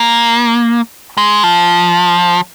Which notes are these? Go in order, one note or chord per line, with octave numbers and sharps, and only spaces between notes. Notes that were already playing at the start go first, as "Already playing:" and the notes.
Already playing: A#3
G#3
F3